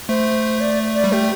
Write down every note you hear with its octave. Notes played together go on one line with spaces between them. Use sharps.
A3 C5
D5
D5
G3
A3 G4